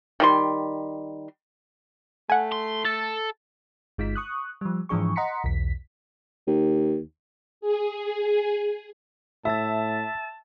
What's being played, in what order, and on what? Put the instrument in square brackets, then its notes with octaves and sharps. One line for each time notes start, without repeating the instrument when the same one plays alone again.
[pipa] D#3 G3 C6
[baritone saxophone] A3 [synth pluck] F#5 G#5
[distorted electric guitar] C6
[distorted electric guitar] A4 [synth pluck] A6
[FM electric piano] G1 G#3 D#4 F4 B6
C#6 D#6 F#6
F3 G3
G#2 E3 F3 D4 G#4 C#6
D#5 F#5 A#5 C6 B6 C#7
B1 E2 B6
[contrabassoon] D#2
[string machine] G#4
[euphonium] A2 [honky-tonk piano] E5 [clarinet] A5 [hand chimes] E6 A6